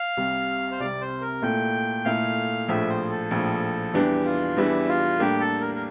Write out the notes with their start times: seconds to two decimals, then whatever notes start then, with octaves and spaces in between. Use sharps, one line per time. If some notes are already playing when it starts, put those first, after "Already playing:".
Already playing: F5
0.17 C2 C3 G3
0.71 C5
0.80 C2 C3 G3 D5
1.01 C5
1.21 A#4
1.42 A#2 A3 E4 A4 G5
2.05 A#2 A3 E4 A4 F5
2.68 A#1 A2 F3 E5
2.89 C5
3.10 A4
3.31 A#1 A2 F3
3.93 E2 E3 G3 D4 G4
4.25 F4
4.57 E2 E3 G3 D4 E4
4.89 F4
5.19 A2 G3 A#3 D4 G4
5.40 A4
5.61 A#4
5.75 A#4